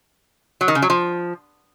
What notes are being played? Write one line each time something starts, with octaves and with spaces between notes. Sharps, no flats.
F#3
D#3
C#3
F#3
F3